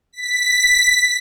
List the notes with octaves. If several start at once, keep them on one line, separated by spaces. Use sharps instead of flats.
B6